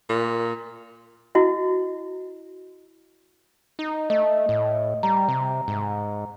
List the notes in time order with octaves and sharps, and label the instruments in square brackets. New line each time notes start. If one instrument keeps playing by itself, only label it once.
[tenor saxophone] A#2
[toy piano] E4 F#4 D#5
[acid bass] D#4
[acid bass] A3 [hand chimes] D#5
[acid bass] A2
[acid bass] G3 [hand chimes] A#5
[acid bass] C3
G#2